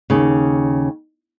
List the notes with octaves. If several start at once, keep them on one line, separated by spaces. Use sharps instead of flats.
D#2 C#3